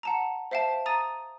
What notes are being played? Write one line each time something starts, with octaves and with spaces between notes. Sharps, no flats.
F#5 A5 A#5
C5 E5 F5 G5 A5
A#5 D#6 A6 D#7